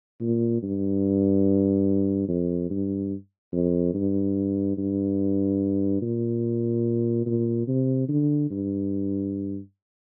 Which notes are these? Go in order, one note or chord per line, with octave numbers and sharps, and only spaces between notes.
A#2
G2
F2
G2
F2
G2
G2
A#2
A#2
C3
D3
G2